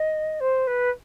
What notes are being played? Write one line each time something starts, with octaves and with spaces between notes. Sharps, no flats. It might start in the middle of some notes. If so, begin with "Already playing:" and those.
Already playing: D#5
C5
B4